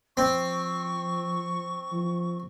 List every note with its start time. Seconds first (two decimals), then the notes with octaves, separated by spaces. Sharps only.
0.17 F3 C4 C#6
1.92 F3